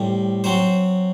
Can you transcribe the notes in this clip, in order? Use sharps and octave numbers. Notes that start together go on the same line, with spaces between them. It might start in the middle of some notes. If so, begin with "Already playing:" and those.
Already playing: A2 G3 C4
F#3 C4 C5